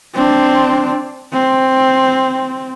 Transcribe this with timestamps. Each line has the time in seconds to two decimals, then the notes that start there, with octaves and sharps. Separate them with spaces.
0.14 C4 D4
1.33 C4